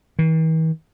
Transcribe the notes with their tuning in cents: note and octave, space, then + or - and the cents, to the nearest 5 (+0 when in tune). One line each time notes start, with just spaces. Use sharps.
E3 -45